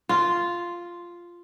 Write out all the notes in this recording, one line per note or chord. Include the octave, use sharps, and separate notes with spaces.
F4